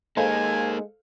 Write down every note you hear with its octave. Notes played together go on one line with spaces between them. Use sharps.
G#3 A#3 D#4 A4 C5 F5 G#5